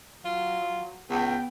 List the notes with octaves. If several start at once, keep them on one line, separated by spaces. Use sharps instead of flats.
F#3 F4
C#2 B3 G5